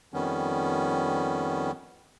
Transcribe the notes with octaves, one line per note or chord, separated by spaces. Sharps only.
F2 D#3 G3 B3 C#4